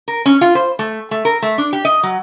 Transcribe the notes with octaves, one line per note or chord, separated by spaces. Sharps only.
A#4
C#4
F4
C5
A3
A3
A#4
A3
D4
G4
D#5
F#3